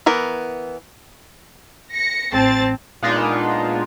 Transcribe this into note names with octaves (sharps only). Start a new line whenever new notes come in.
E3 B3 A#4
A#6 C#7
A1 C4 A5 A6
A#2 G#3 B3 D4 D#4 F4